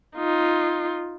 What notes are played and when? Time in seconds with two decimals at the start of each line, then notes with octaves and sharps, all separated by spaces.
0.16 D#4 F4